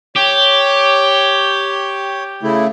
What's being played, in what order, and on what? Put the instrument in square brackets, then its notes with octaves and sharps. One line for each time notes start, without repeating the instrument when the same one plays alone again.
[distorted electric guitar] G4 [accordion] C#5
[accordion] C#3 A3 E4